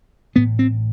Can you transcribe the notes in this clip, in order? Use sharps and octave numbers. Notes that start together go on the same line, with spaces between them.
A1 A2 B3
C4